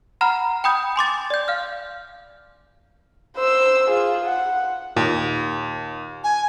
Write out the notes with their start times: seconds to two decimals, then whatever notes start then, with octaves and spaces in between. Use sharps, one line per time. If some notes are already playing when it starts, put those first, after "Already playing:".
0.21 F#5 A#5 B5 F6
0.64 G5 B5 D#6 G6
0.96 G#5 C6 D6 A6
1.30 D5 G6
1.48 F5 F6
3.36 C5 E6
3.90 F4 G#4
4.24 F#5
4.96 D#2 A#2
6.23 G#5